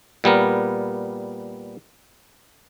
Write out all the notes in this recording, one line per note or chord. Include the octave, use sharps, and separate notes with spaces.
A#2 G3 B3 A#4